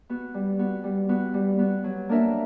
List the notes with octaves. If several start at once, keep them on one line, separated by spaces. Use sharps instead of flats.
B3 F#4
G3
B3 F#4
G3
B3 F#4
G3
B3 F#4
F#3
A#3 D4 A#4 E5